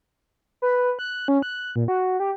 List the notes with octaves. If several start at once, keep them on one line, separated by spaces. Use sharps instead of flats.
B4
F#6
C#4
F#6
A#2
F#4
G4